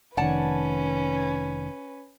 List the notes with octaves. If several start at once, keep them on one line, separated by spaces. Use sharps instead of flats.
F1 D#3 C#4 B4 D5 F#5 A5